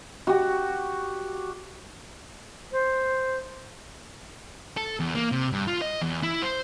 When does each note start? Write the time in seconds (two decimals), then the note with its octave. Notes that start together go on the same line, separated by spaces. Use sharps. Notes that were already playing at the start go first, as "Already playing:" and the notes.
0.27 F#4 G4
2.72 C5
4.77 A4
5.00 E2
5.15 A#3
5.32 C3
5.52 G2
5.68 F4
5.81 D#5
6.02 E2
6.23 E4
6.43 C5